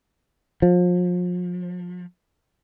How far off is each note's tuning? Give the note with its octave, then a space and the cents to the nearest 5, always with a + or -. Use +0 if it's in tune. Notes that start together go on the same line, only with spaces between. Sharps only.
F3 +35